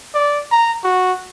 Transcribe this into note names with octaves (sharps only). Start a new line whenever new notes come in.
D5
A#5
F#4